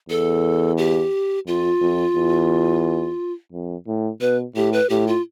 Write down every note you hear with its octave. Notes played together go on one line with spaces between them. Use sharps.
E2 A4
G4
F2 F4
F2
E2
F2
A2
B2 B4
A2 G4
B4
A2 G4
F4